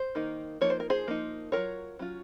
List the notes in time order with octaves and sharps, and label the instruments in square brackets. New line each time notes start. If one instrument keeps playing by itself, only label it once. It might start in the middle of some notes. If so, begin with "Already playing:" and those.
Already playing: [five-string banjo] C5
D#3 A#3 D#4
F3 A#3 D#4 C#5
C5
A#4
G#4 C5
F3 A#3 D#4
F#3 C#4 F4 A#4 C#5
F#3 C#4 F4